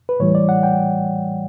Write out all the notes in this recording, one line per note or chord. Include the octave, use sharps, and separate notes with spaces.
B4
A2 E3 G3 C#5
D5
F#5
G5